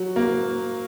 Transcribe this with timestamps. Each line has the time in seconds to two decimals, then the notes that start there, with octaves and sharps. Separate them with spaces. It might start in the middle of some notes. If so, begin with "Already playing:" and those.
Already playing: F#3
0.16 A#3